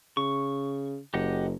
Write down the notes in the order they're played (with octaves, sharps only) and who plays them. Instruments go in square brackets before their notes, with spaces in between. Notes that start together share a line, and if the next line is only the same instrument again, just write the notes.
[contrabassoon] C#3 [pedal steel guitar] C#6
[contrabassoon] F#1 [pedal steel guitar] G4 D#5 F#5